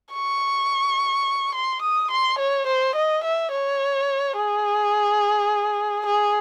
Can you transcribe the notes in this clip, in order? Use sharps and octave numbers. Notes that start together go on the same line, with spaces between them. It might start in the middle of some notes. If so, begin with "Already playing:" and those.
C#6
C6
D#6
C6
C#5
C5
D#5
E5
C#5
G#4
G#4